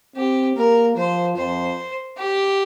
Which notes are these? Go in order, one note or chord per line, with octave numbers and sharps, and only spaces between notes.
C4 G4
A#3 A#4
F3 C5
F2 C5
G4